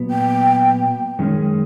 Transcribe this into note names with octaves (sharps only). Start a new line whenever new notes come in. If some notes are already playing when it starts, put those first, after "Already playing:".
Already playing: A#2 F#3 B3
G5
F#2 D#3 G#3 C#4